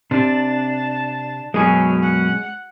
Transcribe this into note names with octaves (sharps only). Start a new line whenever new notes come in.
C3 D4 A5
F#2 B2 F#3 G#3 C#4 G#4
F#5